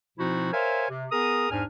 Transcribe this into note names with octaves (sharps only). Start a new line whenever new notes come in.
B2 F3 C4 D#4 E4 F#4
A#4 C5 C#5 E5 F5 G#5
C3
B3 G#4 A#4 A#5 D#6
E2 G#2 D4 G#5 F6